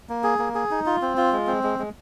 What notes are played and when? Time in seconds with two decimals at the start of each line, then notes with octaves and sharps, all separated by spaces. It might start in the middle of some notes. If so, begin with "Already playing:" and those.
0.09 A#3
0.23 G#4
0.39 A#3
0.55 G#4
0.71 D#4
0.86 F4
1.02 C4
1.17 F4
1.33 G#3
1.47 C4
1.63 G#3
1.79 G#3